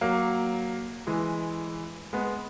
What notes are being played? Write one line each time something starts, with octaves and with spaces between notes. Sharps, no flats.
F#3 A#3
E3 G#3
G#3 B3